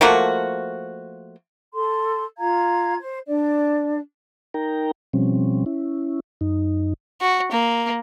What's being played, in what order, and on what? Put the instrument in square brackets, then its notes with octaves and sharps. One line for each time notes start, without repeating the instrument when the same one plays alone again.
[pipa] F3 A3 A#3 F#4
[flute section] A4 C6
F4 F5 A#5 G#6
C5
D4 D5
[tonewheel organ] D#4 A#4 G5 A#5
B2 F3 G3 C4 C#4
C#4 E4
F#2 D#4
[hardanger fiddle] F#4
A#3